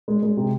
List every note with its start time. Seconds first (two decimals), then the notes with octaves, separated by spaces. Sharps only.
0.08 G#3
0.23 G#3
0.37 C3